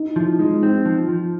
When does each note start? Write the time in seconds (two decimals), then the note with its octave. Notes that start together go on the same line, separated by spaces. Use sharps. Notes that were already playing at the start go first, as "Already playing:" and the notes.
Already playing: D#4
0.16 F3 E4
0.39 G#3 D#4
0.62 C4 D#4
0.85 F3
1.09 F3